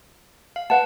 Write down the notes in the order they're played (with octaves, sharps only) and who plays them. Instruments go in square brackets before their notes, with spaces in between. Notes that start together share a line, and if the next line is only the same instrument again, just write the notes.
[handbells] F5
[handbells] B4 A5 [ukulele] D5 F5 F#5